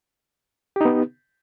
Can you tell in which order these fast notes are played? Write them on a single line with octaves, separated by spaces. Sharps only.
G4 D#4 B3